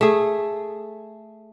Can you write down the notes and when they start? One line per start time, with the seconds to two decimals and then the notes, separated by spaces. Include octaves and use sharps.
0.01 A3 G#4